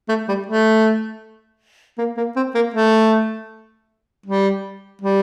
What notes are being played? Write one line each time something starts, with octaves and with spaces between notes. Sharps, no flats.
A3
G3
A3
A#3
A#3
C4
A#3
A3
G3
G3